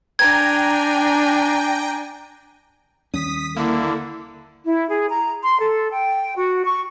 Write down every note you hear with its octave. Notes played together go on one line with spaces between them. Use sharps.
D4 G5 G#5 A#5 G#6
D#2 G3 C#4 D#6 B6
D3 A#3 E4
E4
G#4
A#5
C6
A4
G5
F#4
C#6